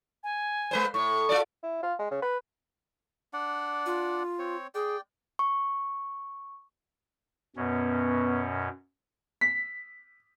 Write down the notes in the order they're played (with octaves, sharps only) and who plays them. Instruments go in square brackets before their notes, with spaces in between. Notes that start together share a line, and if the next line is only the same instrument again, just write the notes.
[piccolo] G#5
[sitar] G#3 B4 C5
[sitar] A2 [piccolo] C#6
[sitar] F4 A4 D5
[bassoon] E4
F4
G#3
C#3
B4
[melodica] D4 D5 F#5
[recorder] F4
[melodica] C4 C#5
[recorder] G#4 [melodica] D5 G5
[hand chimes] C#6
[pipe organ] F#2 B2 C#4 [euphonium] B3
[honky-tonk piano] B6